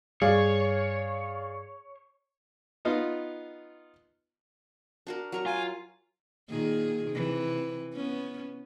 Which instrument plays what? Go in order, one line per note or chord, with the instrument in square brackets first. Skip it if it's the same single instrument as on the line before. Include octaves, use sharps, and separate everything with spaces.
[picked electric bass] G2 G3 [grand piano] G#4 D5 F5 [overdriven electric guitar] C#5
[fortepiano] B3 D#4 F4
[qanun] D4 F#4 A#4
F#3 A#4 C#6
[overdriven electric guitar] F4 [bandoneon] G#5
[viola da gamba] A#2 D#3 G#4
C3 E3
B3 C#4